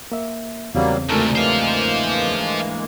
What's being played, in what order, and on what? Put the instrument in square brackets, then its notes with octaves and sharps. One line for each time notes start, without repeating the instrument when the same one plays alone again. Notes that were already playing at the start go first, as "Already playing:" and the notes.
[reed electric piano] A#3 E5
[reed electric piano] E2 C#3 C4 [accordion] F#3 G3 A#3
[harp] D2 G#2 D#4 [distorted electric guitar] C3 A3 [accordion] A4 A#4
[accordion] E3 G#3 A#3 [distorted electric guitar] C5 F5